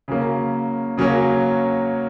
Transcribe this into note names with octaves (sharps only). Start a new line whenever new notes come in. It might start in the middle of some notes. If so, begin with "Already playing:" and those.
C#3 F#3 A#3 C#4
C#3 F#3 A#3 C#4